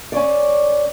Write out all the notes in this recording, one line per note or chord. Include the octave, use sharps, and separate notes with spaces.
C#4 C#5 D5